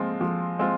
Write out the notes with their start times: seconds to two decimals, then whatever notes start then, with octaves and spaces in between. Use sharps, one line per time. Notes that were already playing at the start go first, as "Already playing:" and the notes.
Already playing: F3 G#3 C4 F4
0.21 F3
0.59 G#3 C4 F4